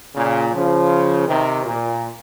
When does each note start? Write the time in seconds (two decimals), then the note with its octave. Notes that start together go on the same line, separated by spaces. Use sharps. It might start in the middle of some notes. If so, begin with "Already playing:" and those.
0.14 A#2 C#3
0.53 C#3 F3
1.27 C3 D#3
1.65 A#2